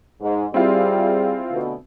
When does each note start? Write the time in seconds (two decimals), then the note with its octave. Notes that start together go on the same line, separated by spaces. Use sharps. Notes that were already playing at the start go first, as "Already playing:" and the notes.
0.21 G#2
0.54 G3 C4 E4 F4 G#4
1.51 D2 B2